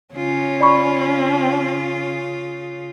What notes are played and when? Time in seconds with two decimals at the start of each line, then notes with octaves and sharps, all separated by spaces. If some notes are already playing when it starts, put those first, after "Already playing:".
0.15 C#3 C#4 F4
0.61 D5 B5 C#6